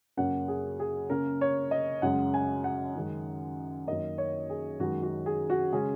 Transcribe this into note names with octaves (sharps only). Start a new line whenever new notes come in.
F#2 C#3 A#3 C#4 F#5
G#4
G#4
C#3 A#3 C#4 A#4
C#5
D#5
F#2 C#3 G#3 C#4 F#5
G#5
F#5
F#2 D#3 G#3 C#4
F#2 D#3 A#3 D#5
C#5
G#4
F#2 D#3 G#3 F#4
F#4
G#4
F#4
C#3 G#3 C#4 G#4